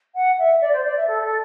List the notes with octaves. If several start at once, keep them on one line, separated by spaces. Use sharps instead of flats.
F#5
E5
D5
C5
D5
E5
A4
A4